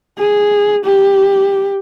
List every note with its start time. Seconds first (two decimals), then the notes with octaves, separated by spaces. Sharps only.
0.18 G#4
0.85 G4